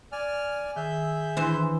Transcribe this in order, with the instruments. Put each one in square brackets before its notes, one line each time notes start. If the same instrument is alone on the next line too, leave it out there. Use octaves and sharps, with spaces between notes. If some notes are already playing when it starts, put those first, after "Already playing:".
[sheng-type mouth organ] D5 G#5 F6
[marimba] D#3 [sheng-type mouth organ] G#4 E5 G6
[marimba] D#3 D4 E4 [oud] E3 C5